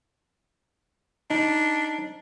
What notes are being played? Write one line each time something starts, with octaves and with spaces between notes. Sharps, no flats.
D4 D#4